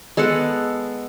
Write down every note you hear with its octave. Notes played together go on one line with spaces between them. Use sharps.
G#3 B3 A4 F#5